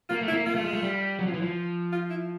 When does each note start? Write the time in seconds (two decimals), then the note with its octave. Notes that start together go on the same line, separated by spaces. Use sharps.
0.09 A#3 F4
0.21 A3
0.28 E4
0.32 A#3
0.46 A#3 F4
0.55 A3
0.64 G#3
0.73 A3
0.83 G3
1.19 F#3
1.27 F3
1.34 E3
1.42 F3
1.92 F4
2.10 E4